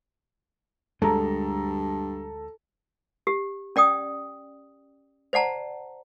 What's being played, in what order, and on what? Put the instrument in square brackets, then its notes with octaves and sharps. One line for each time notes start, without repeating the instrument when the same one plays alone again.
[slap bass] D2 G#3 [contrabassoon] G2 [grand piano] A4 A#5
[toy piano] G4
C#4 D5 G5 D#6
C5 D5 F#5 A5 A#5